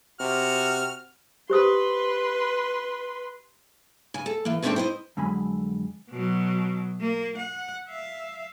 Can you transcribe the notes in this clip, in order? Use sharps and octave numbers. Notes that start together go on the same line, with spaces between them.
C3 F#4 F6
G4 B4 C5 C6 D#6
C#3 G#5
A4
E3 A#3
D2 G#2 A3 C4 D4 G5
E4 C5 D#5
F2 D3 F#3 G#3 G#5 B5
B2 F#3
A#3
F#5
E5 F5